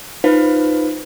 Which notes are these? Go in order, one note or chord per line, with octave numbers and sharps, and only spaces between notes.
D#4 F4 B4 C5 F5